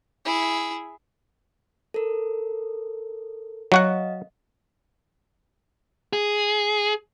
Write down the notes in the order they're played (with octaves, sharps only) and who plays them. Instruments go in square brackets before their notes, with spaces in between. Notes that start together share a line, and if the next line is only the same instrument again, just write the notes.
[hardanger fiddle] E4 G#4
[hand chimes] A4 A#4
[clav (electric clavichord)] F#3 F#4 F#5 [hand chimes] D#5 F5
[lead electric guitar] G#4